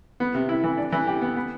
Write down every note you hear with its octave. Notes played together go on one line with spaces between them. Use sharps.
B3
C3
E4
E3
D4
E3
G4
B3
B3